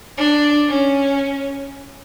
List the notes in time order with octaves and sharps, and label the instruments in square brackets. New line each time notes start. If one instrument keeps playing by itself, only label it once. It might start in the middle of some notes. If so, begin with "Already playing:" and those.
[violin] D4
C#4